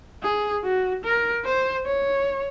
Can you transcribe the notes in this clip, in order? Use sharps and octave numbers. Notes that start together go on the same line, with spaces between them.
G#4
F#4
A#4
C5
C#5